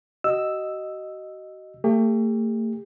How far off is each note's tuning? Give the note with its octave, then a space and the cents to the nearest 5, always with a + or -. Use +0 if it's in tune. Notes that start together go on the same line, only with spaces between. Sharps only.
F#4 +35 D#5 +0 E6 +0
A3 +40 G4 +40